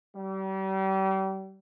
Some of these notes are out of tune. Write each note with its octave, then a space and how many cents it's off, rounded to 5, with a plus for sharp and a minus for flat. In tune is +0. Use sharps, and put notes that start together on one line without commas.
G3 -35